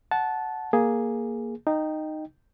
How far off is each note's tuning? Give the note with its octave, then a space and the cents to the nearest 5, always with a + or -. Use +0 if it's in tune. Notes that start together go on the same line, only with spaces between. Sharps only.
F#5 +0 A5 -15
A#3 +5 G#4 +0
D#4 -10 G5 +0